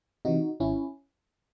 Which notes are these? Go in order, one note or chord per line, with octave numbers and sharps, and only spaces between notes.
C3 E3 D#4 F#4
G#1 C#4 E4